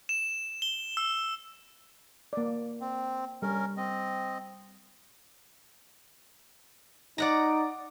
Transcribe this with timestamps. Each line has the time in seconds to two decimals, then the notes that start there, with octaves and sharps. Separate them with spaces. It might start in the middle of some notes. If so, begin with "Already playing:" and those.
0.09 E7
0.62 G7
0.97 E6
2.33 A#3 D5
2.81 C4
3.42 G3 C#4 A#4
3.77 C4 D#5
7.18 D#4 D5 F#5 A#5